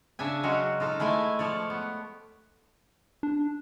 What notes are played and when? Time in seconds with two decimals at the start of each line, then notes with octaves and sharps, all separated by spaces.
0.19 C#3 D4 E5 G#5
0.43 F#3 G#3 C#4 F#4
0.80 D#4 F4 A4
1.00 G#3 A3 E4 G5 G#5
1.39 F3 C#5 D5
1.70 B3
3.23 D4